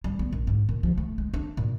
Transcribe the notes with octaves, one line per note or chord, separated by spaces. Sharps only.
G3
B3
A#1
G#2
A#2
F3
A3
G#3
D4
A#2